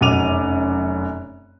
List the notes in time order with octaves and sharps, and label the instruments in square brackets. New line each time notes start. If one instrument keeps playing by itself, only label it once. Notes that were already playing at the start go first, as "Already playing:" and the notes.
[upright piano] F1 F#2 F#4 D6 D#7 F7